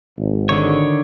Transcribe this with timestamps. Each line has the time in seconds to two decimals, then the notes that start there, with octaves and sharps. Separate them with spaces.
0.18 G#1
0.49 D3 D#3 C#5